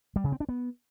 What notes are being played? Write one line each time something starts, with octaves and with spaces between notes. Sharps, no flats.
G3
C#3
C4
D4
B3